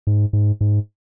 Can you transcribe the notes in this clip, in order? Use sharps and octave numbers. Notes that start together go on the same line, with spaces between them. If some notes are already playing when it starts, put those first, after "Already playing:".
G#2
G#2
G#2